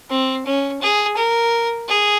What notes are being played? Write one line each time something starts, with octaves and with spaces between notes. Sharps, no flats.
C4
C#4
G#4
A#4
G#4